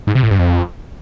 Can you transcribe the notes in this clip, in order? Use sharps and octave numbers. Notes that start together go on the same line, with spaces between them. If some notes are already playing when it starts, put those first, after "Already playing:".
G#2
C3
A2
G2
F2